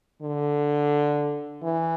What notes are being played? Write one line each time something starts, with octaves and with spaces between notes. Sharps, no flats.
D3
E3